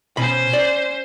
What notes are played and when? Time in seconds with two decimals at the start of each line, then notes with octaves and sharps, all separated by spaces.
0.17 B2 C#4 C5 B5
0.53 D5